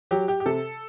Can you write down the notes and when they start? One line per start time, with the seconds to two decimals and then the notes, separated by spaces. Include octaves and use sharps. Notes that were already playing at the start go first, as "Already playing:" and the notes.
0.11 F#3 G4
0.28 G4
0.40 G4
0.46 C3 A4